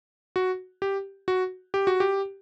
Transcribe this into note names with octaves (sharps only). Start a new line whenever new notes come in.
F#4
G4
F#4
G4
F#4
G4